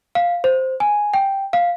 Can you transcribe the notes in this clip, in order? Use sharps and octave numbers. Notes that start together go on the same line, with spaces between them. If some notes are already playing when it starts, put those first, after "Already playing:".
F5
C5
G#5
G5
F5